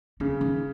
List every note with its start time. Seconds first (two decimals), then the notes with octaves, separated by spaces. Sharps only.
0.20 C#3 C#4
0.41 D#3